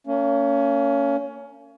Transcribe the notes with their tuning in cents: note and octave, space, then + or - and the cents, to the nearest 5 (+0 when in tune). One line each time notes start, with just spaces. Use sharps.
A#3 -35 C#4 +20